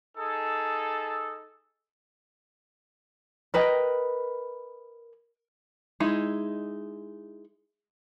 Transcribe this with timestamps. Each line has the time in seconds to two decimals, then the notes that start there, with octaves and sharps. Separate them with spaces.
0.17 D#4 G#4 A4
3.54 A#4 B4 D#5 G5
6.00 G#3 D#4 E4